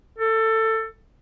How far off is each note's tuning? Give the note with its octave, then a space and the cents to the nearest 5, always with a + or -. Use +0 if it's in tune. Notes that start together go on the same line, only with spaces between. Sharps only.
A4 +20